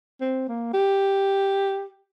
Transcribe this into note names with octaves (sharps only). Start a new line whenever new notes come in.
C4
A#3
G4